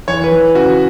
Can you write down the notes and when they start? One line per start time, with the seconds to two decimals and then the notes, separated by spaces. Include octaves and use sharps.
0.08 E3 C#5
0.24 B4
0.32 E3
0.55 C#3 F#4